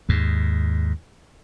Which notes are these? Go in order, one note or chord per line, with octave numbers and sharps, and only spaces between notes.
D#2 G#2